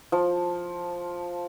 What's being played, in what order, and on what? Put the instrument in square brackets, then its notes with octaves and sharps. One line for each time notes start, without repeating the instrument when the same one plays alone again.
[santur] F3